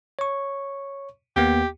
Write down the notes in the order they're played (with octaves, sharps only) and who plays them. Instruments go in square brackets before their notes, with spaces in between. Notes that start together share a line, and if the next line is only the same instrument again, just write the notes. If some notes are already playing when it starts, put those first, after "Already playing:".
[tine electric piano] C#5 C#6
[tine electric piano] D#2 A#3 B3 [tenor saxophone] G4